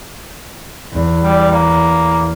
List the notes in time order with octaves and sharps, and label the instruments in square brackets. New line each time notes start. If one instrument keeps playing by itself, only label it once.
[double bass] E2
[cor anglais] G3
A#3